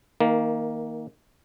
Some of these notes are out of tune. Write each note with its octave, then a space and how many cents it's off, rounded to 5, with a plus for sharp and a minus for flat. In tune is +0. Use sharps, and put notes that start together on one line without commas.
D#3 +20 A#3 +0